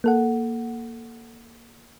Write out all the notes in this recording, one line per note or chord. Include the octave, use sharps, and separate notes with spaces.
A#3 A4 F#5